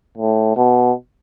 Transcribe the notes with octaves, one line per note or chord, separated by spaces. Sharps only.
A2
B2